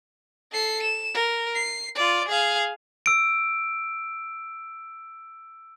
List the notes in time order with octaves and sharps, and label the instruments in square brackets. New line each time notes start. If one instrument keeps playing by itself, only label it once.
[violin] A4 C7
E7
A#4
C7
F4 D5
G#4 F5
[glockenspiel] E6 D7